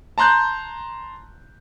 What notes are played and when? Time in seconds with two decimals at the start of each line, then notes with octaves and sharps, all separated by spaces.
0.18 A5 A#5 C6 F#6 G6